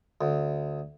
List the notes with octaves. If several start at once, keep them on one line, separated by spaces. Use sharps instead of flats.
D2